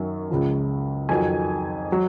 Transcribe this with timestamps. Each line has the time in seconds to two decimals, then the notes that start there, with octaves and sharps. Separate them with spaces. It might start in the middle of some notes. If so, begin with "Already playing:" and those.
Already playing: F#2 D#3 F#3
0.30 C#2 C#3 F3
1.09 F2 D#3 F#3 G#5
1.92 F#3